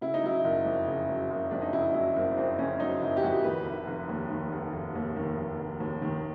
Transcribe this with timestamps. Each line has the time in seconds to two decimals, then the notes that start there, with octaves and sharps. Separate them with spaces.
0.01 C#3 E4
0.14 D#4
0.23 F#3 E4
0.44 F#1
0.66 F2
0.87 C#3
1.09 F#3
1.30 F#1
1.51 F2 D4
1.62 D#4
1.73 C#3 E4
1.94 F#3 E4
2.16 F#1 C4
2.37 F2 C4
2.59 C#3 C#4
2.80 F#3 D#4
3.02 F#1 E4
3.17 G4
3.23 F2 F#4
3.44 D#3 B4
3.66 F1
3.87 F1
4.09 D#2
4.30 D#3
4.52 F1
4.73 F1
4.95 D#2
5.16 D#3
5.38 F1
5.59 F1
5.80 D#2
6.02 D#3